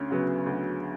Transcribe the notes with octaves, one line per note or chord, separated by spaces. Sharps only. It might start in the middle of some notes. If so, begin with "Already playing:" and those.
Already playing: D2 C#4
C#3 F#3 B3
D2